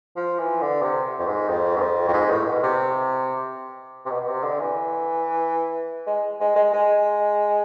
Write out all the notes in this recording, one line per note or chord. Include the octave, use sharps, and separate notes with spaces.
F3
E3
D3
C3
F2
G#2
F2
G#2
F2
F2
G#2
A2
B2
C3
C3
B2
B2
C3
D3
E3
G#3
G#3
G#3
G#3